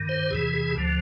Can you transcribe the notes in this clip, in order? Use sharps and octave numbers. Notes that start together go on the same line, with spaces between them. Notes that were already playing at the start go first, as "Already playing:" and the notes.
Already playing: G2 D#3
C5
E2 C3 E3 G#4
G#4
D2 D3 F3